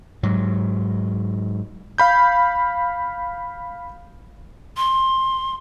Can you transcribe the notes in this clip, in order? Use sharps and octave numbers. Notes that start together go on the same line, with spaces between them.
G#2 F#3
F5 B5 G6
C6